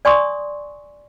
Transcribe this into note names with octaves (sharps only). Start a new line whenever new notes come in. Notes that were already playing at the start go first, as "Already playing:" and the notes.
D5 G#5 C6 C#6 D#6